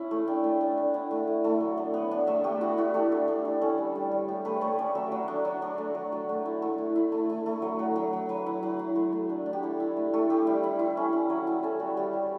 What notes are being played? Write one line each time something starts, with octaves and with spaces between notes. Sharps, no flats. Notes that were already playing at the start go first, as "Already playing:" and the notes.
Already playing: C#4 E4
A3
D4 G5
A3
D4
D4
E4 F#5
A3
E4
A3
F#3
D4
B3
D4
A3 E5
A3 G4
E4 F#4
E4 F#4
A3 G4
D4
D4
D4
C#4 A4
G3
G3
G3
A3 G4
A3 B4
A3 C#5
C#4 D5
F#3 E5
F#3
D4
F#3
D4 D5
A3
F#3
F#3
A3
E4
A3
E4
E4
A3
A3
A3
F#3
F#3
F#3
F#3
F#3 B4
E4
F#3
E4
A3
A3
D4
D4
G4
E4 A4
E4
A3
A3
E4 G4
G3
E4
E4
C#4
E4
F#3
E4
C#4 A4
G3 F#4
G3 G4
G3